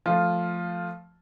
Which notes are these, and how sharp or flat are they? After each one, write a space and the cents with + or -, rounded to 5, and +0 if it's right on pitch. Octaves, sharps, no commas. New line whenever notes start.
F3 +0 A3 +0 F4 +0